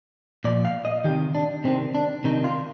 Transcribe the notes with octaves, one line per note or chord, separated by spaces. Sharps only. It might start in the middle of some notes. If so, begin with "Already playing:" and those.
A#2 F3 D5
F5
D#5
C3 D#3 G4
D4
C3 D#3 C4
D4
C3 D#3 D#4
F4